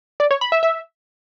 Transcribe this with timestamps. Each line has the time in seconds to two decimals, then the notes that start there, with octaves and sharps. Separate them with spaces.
0.20 D5
0.31 C#5
0.41 B5
0.52 E5
0.63 E5